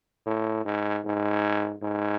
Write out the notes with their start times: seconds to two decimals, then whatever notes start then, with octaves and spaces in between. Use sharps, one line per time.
0.26 A2
0.65 G#2
1.05 G#2
1.82 G#2